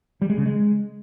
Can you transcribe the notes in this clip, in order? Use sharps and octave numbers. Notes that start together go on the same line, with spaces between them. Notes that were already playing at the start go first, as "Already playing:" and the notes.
G3
G#3
C#3
G#3